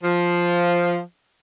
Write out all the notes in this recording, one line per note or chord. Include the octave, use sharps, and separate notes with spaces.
F3